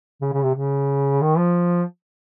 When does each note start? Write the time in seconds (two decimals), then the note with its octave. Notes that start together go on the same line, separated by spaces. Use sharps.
0.22 C#3
0.33 C#3
0.43 C3
0.55 C#3
1.21 D#3
1.38 F3